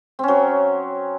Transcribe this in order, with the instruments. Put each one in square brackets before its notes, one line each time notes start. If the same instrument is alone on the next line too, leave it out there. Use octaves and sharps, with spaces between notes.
[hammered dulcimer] C4
C#4
F#3